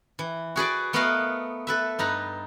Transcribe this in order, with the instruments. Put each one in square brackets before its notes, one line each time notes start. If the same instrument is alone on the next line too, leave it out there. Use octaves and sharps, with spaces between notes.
[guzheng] E3
F#4 G#4 B4 D5
A3 B3 A#4 B4 D#5 F5
A4 B4 E5
G2 D#4 B4 A#5